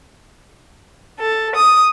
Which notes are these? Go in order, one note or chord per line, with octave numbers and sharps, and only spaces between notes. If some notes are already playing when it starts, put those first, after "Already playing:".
A4
D#6